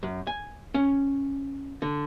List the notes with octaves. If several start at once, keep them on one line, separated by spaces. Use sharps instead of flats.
F#2
G#5
C#4
D3